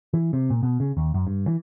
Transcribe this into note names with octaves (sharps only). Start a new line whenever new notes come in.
E3
C3
A#2
B2
C#3
D#2
F#2
G2
E3